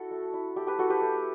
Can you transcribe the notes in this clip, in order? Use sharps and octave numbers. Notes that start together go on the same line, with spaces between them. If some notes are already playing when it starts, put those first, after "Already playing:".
Already playing: E4 F#4 A4
A3
E4
A3 G4
G4 B4
E4 F#4 A4
G4 B4
A3